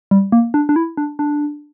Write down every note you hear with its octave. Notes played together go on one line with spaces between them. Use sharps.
G3
A#3
D4
D4
E4
D4
D4